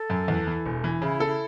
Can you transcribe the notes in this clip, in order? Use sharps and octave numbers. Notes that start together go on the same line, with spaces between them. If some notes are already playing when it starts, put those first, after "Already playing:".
Already playing: A4
F#2
E2
E3
E1
E3
C#3 E4
A4
E4